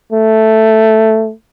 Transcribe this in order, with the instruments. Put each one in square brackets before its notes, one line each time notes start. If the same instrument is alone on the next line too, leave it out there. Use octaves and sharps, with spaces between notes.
[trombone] A3